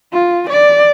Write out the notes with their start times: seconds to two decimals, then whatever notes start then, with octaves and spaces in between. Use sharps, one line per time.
0.13 F4
0.49 D5